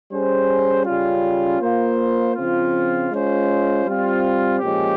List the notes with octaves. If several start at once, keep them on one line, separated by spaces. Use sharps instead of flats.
G3 C#4 G#4 C5
C#3 G3 C#4 F4
A#3 F4 C5
C#3 F3 C4 F4
G#3 C#4 F4 C5
G3 C4 F4
A#2 F3 G#3 C#4 G4